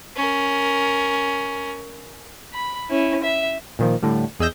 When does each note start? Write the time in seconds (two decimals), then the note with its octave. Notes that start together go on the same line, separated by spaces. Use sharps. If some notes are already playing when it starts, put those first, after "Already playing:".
0.16 C#4 A#4
2.54 B5
2.90 C#4 E4
3.23 E5
3.79 A#2 D#3 F3
4.02 A2 D3 G3
4.40 E2 G#4 D#5 E6 G6 A#6